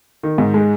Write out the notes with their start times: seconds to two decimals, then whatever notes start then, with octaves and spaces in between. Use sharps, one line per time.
0.23 D#3
0.38 G#2
0.54 G#3